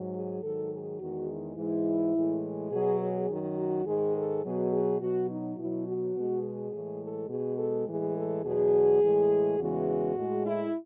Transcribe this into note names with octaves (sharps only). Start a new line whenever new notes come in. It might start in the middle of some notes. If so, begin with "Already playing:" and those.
Already playing: G#2 F#3
G#4
G#2 D#3 F#3 A4
G#4
E2 D#3 G#3 F#4
E4
G#2 E3 G#3 E4
A2 E3 G#3
B2 F#3 G#4
G#4
F#2 D#3 F#3
F#4
G#2 D#3 G#3 G#4
A4
B2 F#3 G#4
G#4
B2 F#3 F#4
D#4
B2 F#3 E4
F#4
B2 G#3
G#4
A2 E3 G#3
A4
B2 G#3 G#4
A4
A2 E3 G#3 G#4
A4
E2 B2 F#3 G#4
A2 E3 G#3
E2 C#3 E3 G#3 F#4
A2 G#3
E4